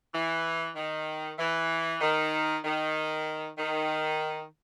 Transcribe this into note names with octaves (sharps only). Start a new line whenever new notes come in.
E3
D#3
E3
D#3
D#3
D#3